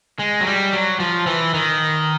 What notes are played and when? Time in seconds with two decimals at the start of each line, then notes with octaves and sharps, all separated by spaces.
0.19 G#3
0.41 F#3
0.47 G3
0.73 F#3
1.00 F3
1.27 E3
1.54 D#3